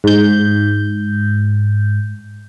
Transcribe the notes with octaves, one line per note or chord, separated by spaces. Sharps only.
G#2 G6